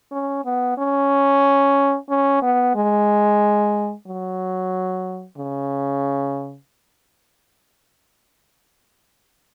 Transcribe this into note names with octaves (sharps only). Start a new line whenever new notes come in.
C#4
B3
C#4
C#4
B3
G#3
F#3
C#3